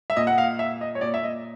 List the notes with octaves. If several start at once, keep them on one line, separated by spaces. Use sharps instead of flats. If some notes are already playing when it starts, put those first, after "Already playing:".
E5
A#2 D#5
F#5
F5
E5
D#5
C#5
A#2 D5
E5
D#5